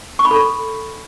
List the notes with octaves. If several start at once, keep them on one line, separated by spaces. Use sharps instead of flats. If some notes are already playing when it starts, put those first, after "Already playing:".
C#6
B5
A4